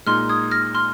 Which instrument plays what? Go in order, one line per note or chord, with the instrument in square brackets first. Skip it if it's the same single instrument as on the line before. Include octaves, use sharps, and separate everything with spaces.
[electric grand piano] A#2 G#3 D#4 [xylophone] C6 F6
[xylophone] D#6 G#6
F6 A#6
C6 F6